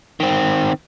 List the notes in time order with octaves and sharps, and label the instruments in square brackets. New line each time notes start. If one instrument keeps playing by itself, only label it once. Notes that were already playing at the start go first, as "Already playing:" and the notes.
[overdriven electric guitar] D#3 C4